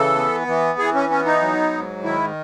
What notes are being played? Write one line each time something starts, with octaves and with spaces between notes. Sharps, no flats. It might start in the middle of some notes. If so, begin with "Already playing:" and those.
Already playing: C#3 E3 A4
B3
E3
E3 G#4
C#4
B3 C#4
D#4
F#3
G#2
D#3 E4